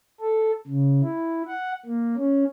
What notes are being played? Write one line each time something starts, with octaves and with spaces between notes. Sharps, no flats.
A4
C#3
E4
F#5
A#3
C#4